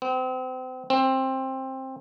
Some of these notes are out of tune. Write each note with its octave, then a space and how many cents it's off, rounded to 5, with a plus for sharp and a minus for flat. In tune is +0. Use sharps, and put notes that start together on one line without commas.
C4 -35
C4 +15